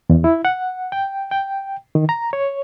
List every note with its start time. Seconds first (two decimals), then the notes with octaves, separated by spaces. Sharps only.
0.10 E2
0.24 E4
0.45 F#5
0.92 G5
1.31 G5
1.95 D#3
2.09 A#5
2.33 C#5